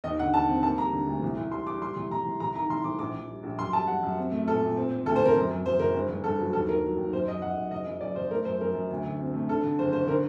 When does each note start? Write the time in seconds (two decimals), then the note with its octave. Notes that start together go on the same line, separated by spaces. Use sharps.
0.04 D#2 D#5
0.19 D3 F#5
0.33 D#2 A5
0.49 C4
0.63 A#3 A5
0.78 G3 A#5
0.92 D3
1.07 D2
1.22 C2
1.37 C2
1.52 G3 C6
1.66 G3 D6
1.81 G3 C6
1.96 C2
2.11 C2 A#5
2.25 C2
2.40 C2 A#5
2.55 D#3 A#5
2.69 C2 C6
2.84 C2 D6
2.99 A#1 D6
3.15 A#1
3.28 G3
3.43 A#1
3.59 F#2 C6
3.73 G3 A5
3.87 G3 F#5
4.03 F#2
4.18 C4
4.32 A3
4.47 A#2 A4
4.61 A#2
4.77 C4
4.91 C4
5.06 D2 A4
5.16 C5
5.21 C4 A#4
5.36 F#2
5.50 F#2
5.66 F#2 C5
5.79 F#1 A#4
5.94 G2
6.09 G2
6.24 G2 A4
6.39 F#3
6.53 D#2 A4
6.68 D#2 A#4
6.84 F#3
6.97 D#2
7.13 F#2 C5
7.27 F#2 D#5
7.42 F#2 F#5
7.57 F#2
7.71 F#1 D#5
7.86 F#2
8.01 F#2 D5
8.16 F#1 C5
8.31 A3 A#4
8.45 F#2 C5
8.61 F#2 A#4
8.75 F#2
8.90 D2
9.05 D3
9.20 C4
9.34 A3
9.49 D3 A4
9.63 D3
9.79 F#1 C5
9.93 F#1 C5
10.07 D3 A#4